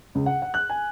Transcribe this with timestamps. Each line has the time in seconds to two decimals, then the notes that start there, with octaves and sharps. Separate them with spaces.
0.15 C#2
0.26 F#5
0.42 F#5
0.54 F#6
0.69 G#5